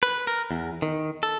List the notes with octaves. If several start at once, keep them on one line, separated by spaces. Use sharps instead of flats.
B4
A#4
E2
D#3
A4